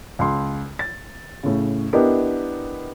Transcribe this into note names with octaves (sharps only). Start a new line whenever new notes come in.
C#2 C6
A6
A2 C#3
B3 D4 E4 G4 A#4 D#5